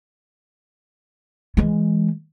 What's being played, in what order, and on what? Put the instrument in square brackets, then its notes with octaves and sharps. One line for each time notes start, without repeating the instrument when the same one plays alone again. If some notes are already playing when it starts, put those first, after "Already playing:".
[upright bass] E3 G#3